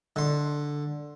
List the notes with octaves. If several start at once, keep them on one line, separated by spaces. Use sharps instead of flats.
D3 C6